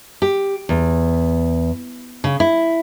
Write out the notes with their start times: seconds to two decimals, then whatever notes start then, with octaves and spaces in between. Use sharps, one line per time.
0.22 G4
0.69 E2
2.24 C#3
2.40 E4